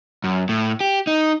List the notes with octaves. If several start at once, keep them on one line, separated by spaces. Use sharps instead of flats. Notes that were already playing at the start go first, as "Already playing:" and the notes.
F#2
A2
G4
D#4